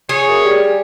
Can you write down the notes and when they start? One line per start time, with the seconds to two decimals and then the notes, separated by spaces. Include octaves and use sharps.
0.09 G#4 C#5
0.29 F#2
0.45 G3